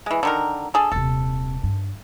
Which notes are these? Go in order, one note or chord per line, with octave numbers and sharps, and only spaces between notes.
E3 G#3
D3 D#3 A#4
D4 G#4 A4
D#1 C3 A4
G2